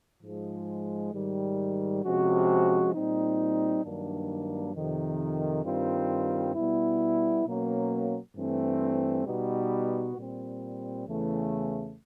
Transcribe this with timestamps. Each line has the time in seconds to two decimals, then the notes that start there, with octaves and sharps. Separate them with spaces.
0.22 G#2 F3 G#3
1.13 G#2 D#3 G3
2.02 C3 F3 G#3 C#4 F#4
2.93 A#2 G3 C4 D#4
3.83 G2 D#3 F#3 A#3 D4
4.73 F2 C3 D#3
5.64 G2 D#3 G3 C4 F4
6.54 B2 G3 B3 E4
7.45 B2 F#3 A#3 C#4
8.34 G2 E3 A3 C4
9.25 B2 G3 B3 D#4 F#4
10.15 A#2 G3 C4
11.06 E2 C#3 E3 A3